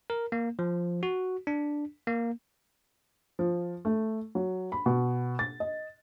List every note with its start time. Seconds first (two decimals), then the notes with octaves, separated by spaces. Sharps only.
0.10 A#4
0.32 A#3
0.59 F3
1.03 F#4
1.47 D4
2.07 A#3
3.39 F3
3.85 A3
4.35 F#3
4.72 B5
4.86 B2
5.39 A6
5.60 D#5